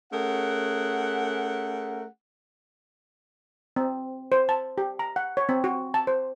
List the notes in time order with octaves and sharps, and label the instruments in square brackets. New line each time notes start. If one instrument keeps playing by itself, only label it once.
[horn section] A3 C#4 G#4 A#4 F#5
[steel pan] C4
C5
A5
G4
A#5
F#5
C#5
C4
F#4
A5
C5